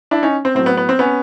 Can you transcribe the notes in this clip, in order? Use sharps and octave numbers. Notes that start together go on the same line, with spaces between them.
D4 E4
C#4 D#4
C4
A2 F#3 C4
B3
B3
C4
B3 C#4